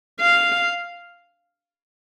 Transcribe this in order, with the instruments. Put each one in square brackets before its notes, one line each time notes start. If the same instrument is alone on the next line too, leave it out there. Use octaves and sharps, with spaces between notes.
[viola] F5